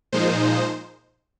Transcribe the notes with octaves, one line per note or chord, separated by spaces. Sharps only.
A#2 F3 G#3 D#4 C5